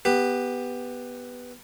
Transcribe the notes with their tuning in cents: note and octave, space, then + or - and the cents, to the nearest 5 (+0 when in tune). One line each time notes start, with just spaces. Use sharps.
B3 +0 G4 +15